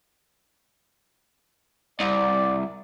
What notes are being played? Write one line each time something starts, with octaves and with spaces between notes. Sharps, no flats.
C2 D5